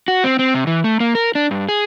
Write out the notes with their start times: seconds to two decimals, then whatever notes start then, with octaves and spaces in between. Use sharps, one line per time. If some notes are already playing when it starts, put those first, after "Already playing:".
0.08 F#4
0.24 C4
0.39 C4
0.54 C3
0.67 E3
0.84 A3
1.00 A#3
1.15 A#4
1.35 D4
1.51 G2
1.69 G#4